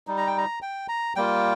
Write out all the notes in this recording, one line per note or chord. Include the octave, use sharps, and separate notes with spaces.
G3 D#4
A#5
G5
A#5
G5
A#5
G3 A#3 F4 G5